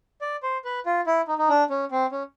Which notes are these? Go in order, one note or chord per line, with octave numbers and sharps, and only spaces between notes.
D5
C5
B4
F4
E4
D#4
D#4
D4
C#4
C4
C#4